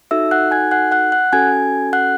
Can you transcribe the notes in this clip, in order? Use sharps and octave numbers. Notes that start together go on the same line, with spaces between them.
D#4 F#4 A4 E5 E6
F#5 F#6
G#5 G#6
F#5 F#6
F#5 F#6
F#5 F#6
C#4 F#4 A4 G#5 G#6
F#5 F#6